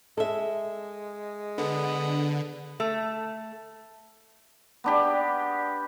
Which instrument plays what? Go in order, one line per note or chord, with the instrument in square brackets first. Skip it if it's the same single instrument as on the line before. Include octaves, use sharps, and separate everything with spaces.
[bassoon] G#3 [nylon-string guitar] A4 E5
[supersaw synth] D3 [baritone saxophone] B3
[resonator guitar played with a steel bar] A3
[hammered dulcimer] B3 D4 G4